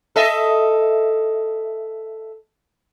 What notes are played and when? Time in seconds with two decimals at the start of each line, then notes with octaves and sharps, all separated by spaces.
0.16 A4 D#5 E5